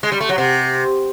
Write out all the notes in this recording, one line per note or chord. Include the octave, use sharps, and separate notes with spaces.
G#3
G3
A3
F#3
C3